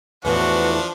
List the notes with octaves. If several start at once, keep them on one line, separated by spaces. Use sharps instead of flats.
E2 A2 E3 F3 D4 F#4 B4